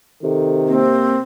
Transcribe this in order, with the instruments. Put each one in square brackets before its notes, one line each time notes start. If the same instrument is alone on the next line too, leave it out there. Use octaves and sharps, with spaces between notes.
[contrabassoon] C3 [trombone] D#3 [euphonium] A4
[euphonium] A#3 [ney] C4